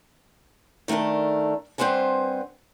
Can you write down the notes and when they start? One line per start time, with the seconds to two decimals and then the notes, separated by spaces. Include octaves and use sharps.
0.88 D#3 A3 D4 A4 A#4
1.78 G2 C4 B4 C5 F#5 G#5